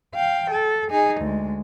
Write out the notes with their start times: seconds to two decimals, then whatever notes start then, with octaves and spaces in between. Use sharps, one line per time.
0.15 F5 G5
0.51 A4
0.90 D#4 G#4
1.21 D2 G#3